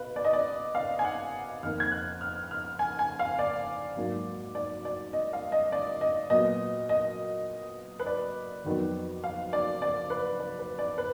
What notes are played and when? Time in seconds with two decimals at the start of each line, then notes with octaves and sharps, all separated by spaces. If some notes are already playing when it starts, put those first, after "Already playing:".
Already playing: B2 B4 F5
0.16 D5
0.24 D#5
0.33 D5
0.75 F5
0.99 G#5
1.05 F#5
1.63 F2 D#3 A#3 F6
1.80 G#6
1.92 F#6
2.21 F6
2.51 F6
2.79 G#5
2.99 G#5
3.19 F5
3.39 D5
3.97 G#2 F#3 A#3
4.55 D5
4.85 D5
5.13 D#5
5.33 F5
5.52 D#5
5.72 D5
6.01 D#5
6.30 A#2 F#3 B3 D#5
6.89 D#5
8.00 B4
8.06 D5
8.65 F2 D#3 F#3 B3
9.24 F5
9.53 D5
9.82 D5
10.10 B4
10.40 D5
10.59 B4
10.79 D5
10.98 B4